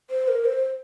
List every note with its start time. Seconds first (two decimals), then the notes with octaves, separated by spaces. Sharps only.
0.10 C5
0.28 A#4
0.45 C5